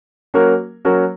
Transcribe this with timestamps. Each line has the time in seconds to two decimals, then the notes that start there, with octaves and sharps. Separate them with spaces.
0.34 F#3 A#3 C#4 F#4 A#4
0.85 F#3 A#3 C#4 F#4 A#4